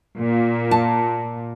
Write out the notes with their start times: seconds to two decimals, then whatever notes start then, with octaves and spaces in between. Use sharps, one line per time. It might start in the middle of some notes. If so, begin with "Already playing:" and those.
0.18 A#2
0.71 A5